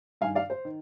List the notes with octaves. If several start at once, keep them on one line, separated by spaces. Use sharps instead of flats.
G2 D#3 F5 G#5
D5 F5
C5
D#3